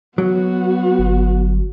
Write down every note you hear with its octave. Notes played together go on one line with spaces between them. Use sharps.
F#3 B3 F#4
G1